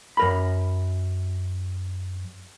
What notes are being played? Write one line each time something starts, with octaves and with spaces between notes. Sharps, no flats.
F#2 A#4 B5